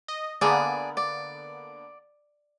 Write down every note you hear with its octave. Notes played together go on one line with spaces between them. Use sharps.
D#5
D3 A#3 B3 G#4 D5
D5